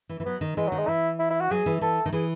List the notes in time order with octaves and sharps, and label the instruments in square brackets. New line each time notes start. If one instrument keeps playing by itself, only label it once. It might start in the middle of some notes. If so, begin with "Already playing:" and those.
[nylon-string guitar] E3
E3
[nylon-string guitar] F#3 [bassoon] B3
[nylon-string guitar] D#3
[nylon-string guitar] E3 [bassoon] G#3
[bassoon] F#3
[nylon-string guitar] D#3
[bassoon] G#3
[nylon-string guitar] E3 [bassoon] E4
[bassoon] E4
E4
F#4
[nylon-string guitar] F#3 [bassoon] G#4
[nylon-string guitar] E3
[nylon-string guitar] E3 [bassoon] A4
[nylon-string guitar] D#3
[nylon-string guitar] E3 [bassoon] G#4